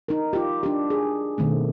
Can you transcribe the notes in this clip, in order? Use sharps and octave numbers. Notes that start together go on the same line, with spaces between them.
D#4 A#4
F4 G4
D4 G4
G#4
B2 D#3 A3 C4